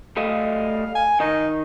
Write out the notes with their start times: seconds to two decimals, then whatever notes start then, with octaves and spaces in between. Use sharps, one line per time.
0.17 G3 A3 D#5 F5
0.95 G#5
1.20 D#3 D#4